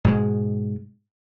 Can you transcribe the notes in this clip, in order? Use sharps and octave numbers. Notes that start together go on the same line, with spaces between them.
G#2 B2 G#3